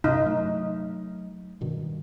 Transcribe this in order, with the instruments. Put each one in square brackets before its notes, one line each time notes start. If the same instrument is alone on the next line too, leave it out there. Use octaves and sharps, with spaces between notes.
[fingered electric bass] G2 C3 [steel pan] D#4
[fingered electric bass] F#3 A3
G2 B2 D#3